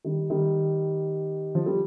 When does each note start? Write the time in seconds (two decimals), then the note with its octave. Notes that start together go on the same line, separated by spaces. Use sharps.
0.05 D#3 G3
0.30 D#3 G3
1.55 F3
1.66 G3